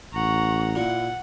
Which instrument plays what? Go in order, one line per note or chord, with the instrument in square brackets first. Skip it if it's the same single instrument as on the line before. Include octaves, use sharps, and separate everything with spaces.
[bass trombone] A1 [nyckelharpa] F#5 A#5 [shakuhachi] C#6
[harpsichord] A#2 [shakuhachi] E4 [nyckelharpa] F#5